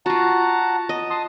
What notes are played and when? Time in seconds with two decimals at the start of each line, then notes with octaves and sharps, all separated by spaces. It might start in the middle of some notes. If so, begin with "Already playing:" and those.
0.06 F4 F#4 F#5 A5 A#5
0.89 D#5
1.10 A5 C6 D#6